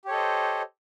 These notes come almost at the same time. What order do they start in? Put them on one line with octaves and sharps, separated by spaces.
G4 C#5 A4 D#5 C5